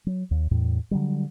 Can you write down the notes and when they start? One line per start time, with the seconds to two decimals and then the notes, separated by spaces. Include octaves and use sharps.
0.06 F#3
0.31 D#2
0.51 E2 A2
0.91 D3 F#3 G3